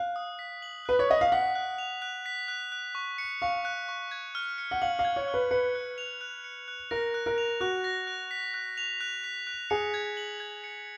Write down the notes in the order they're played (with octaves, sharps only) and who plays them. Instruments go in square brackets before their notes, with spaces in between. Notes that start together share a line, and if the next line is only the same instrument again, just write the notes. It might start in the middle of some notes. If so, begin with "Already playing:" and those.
Already playing: [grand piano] F5 [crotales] F#6
[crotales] D#6
B6
F#7
[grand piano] B4 [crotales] F#6
[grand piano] C#5
[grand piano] D#5 [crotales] D#6
[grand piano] F5
[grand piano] F#5 [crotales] B6
[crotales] F#6
F7
F#6
B6
F#6
F#6
C#6
C#7
[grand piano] F5 [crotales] C#6
[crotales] F#6
C#6
G#6
F6
C#7
[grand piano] F#5
[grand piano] F5 [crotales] F#7
[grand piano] F5
[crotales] G#6
[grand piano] C#5
[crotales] F6
[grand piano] B4
[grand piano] B4 [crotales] C#7
[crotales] F#6
F7
F#6
C#7
F#6
[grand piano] A#4 [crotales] A#6
[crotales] F#6
[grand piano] A#4
[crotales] F7
[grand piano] F#4 [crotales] F#6
[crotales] A#6
F#6
B6
F#6
F7
F#6
B6
F#6
[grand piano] G#4 [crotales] C#7
[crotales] G#6
F#7
G#6
C#7